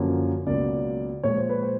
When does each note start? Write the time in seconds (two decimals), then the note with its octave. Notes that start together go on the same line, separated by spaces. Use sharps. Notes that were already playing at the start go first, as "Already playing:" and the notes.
Already playing: F#2 D3 F3 A#3
0.46 C#2 B2 F#3 A#3 D5
1.23 A#2 F3 G#3 C#5
1.37 C5
1.49 B4
1.63 C5